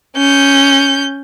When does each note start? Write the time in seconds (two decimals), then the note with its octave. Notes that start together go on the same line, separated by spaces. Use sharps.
0.17 C#4 G6